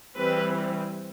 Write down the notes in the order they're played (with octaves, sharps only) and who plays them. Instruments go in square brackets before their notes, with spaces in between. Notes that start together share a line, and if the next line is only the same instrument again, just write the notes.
[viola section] E3 G3 C4 B4